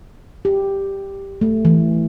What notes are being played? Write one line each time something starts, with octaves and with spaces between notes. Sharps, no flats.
G4
A3
E3